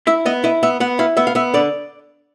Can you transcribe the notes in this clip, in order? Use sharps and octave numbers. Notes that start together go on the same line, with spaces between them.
E4 E5
B3 D#5
E4 D#5
B3 E5
B3 F#5
E4 F5
B3 E5
F5
B3 E5
D3 D5